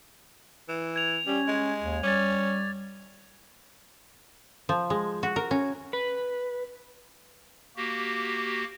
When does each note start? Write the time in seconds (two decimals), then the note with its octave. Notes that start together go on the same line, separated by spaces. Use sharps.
0.68 E3
0.96 G#6 F7
1.27 G3 C#4
1.48 G#3
1.82 D#2
2.03 G3 C#4 D6 G#6 A6
4.69 F3
4.90 G#3
5.23 F#4
5.36 A#4
5.51 C#4
5.93 B4
7.76 A#3 F#4 G4